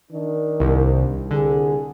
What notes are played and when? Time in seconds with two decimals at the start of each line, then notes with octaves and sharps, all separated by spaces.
0.11 D#3 D4
0.60 C2
1.31 C2 D3 G#4